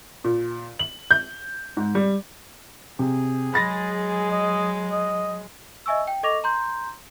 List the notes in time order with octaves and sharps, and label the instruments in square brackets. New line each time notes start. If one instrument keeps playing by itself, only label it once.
[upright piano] A#2
F#7
G6
G#2
G3
[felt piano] C3 [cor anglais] G#4
[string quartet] F#3 G#3 [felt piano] B5 A6 A#6
[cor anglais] D#5
D#5
[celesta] D#5 E5 G#5 C#6 E6
G5
A4 D#5 C#6 D6 A#6 F7
A#5 C6 G6